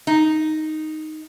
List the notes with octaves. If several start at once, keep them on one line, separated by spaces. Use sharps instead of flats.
D#4